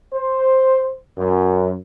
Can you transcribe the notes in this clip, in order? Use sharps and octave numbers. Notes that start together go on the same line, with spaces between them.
C5
F#2